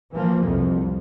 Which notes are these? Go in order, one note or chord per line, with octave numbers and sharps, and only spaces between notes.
E3 F3 A#3
C2 F2 C3